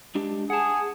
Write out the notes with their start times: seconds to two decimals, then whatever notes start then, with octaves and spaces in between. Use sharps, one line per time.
0.15 G#3 D4 G4
0.50 G#4 F#5 A5